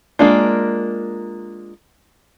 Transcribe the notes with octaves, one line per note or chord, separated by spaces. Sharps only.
G#3 A#3 D4 F4